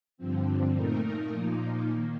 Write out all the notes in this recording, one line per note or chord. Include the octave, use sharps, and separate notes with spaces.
G2 D3 F3 C4
A#2 A3 D#4 A#4
A#2 F3 A#3 D#4
D#3 A#3